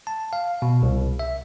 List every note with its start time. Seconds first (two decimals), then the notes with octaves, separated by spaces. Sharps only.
0.07 A5
0.33 F5
0.62 B2
0.83 C2
1.19 E5